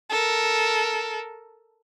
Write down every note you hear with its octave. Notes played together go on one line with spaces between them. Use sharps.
A4 A#4